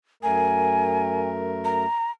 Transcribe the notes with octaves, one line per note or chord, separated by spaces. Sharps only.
F#2 A3 A#4 G#5
A#5